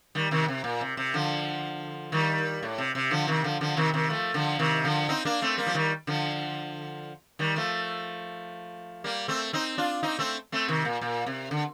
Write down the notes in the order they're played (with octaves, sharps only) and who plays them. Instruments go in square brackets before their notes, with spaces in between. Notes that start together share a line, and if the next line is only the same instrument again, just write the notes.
[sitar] D#3 G3
C3 D#3
C3
A#2
C3
C3
D3 F3
D#3 G3
A2
C3
C3
D3 F3
C3 D#3
D3 F3
D3 F3
C3 D#3
C3 D#3
F3 A3
D3 F3
C3 D#3
D3 F3
C4 D#4
A#3 D4
A3 C4
G3 A#3
F3
D#3 G3
D3 F3
D#3 G3
F3 A3
G3 A#3
A3 C4
C4 D#4
D4 F4
C4 D#4
A3 C4
A3 C4
C3 D#3
A#2
A#2
C3
D3